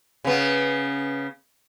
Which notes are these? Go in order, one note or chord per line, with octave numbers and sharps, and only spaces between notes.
C#3 B3